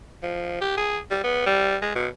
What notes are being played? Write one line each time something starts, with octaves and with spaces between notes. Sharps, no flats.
F3
G4
G#4
G3
B3
G3
G#3
B2